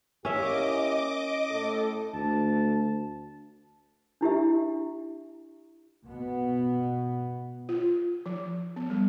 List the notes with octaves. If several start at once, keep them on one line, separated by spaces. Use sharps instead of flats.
A#3 C#4 E4 G4 D#5 E5 D6
A2 A4
D2 A5
D4 E4 G4 E5
B2 B3
F4
F3
B3
G3